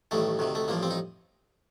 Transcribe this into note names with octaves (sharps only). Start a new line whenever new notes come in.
A1 G2 D#3 A3
D2 C3 D#3
A3
A1 G2 F3 A#3
C4
D#4